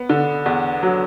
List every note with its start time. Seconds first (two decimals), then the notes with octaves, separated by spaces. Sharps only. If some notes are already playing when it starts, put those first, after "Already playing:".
Already playing: B3
0.09 D3
0.46 E2
0.83 F#3